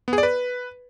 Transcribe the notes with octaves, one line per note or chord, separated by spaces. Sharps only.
B3
G#4
D5
B4